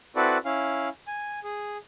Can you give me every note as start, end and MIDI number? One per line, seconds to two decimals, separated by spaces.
0.16 0.38 60
0.16 0.38 64
0.16 0.38 66
0.16 0.38 69
0.16 0.38 71
0.16 0.38 74
0.45 0.89 61
0.45 0.89 64
0.45 0.89 77
1.07 1.40 80
1.44 1.78 68